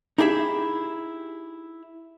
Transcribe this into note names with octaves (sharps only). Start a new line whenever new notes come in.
D#4 E4 G4 G#4 D5 E5